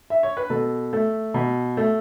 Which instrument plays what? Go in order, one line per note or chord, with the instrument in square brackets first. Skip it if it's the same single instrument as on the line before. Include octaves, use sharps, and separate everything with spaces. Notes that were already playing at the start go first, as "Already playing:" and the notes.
[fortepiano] E5
C#5
B4
B2 A4
A3
B2
A3